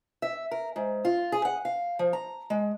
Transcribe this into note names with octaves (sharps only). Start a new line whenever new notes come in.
E5
A#4
G#2
F4
G#4
F#5
F5
F3
A#5
G#3